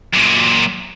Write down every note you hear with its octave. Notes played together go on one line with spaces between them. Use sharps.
F#2 A#2